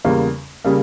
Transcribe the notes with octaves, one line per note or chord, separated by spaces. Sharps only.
E2 C#3 G3 A#3
C#3 G3 A#3